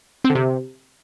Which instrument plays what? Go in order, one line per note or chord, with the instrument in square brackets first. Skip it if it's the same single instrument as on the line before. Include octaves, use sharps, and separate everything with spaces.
[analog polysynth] C4
D3
C3